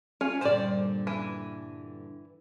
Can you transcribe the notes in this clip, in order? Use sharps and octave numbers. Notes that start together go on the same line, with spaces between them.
C#4 F4
G2 A#2 D3 C5 D5
E3